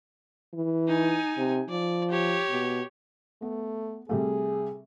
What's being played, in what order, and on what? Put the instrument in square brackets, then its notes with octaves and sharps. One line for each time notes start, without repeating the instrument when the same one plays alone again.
[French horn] E3
[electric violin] D#4 G#5
[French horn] C3
[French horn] F3 [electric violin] D5
[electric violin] G4 C#5
[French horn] B2
[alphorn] A3 [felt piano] B3
[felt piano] C3 G3 A3 [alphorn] G#4